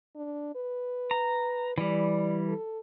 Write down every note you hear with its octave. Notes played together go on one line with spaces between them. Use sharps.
D4
B4
A#5
E3 G3 D5
A4